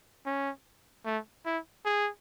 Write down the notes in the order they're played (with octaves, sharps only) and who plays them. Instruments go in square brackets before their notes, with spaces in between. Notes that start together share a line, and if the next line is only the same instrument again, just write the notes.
[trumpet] C#4
A3
E4
G#4